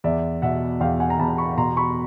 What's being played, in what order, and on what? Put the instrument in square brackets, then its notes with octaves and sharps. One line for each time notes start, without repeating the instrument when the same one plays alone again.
[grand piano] E2 D5 E5
B2 E5 F#5
E2 F5 G5
F#5 G#5
A#5
E2 A5 B5
B5 C#6
B2 A#5 C6
B5 C#6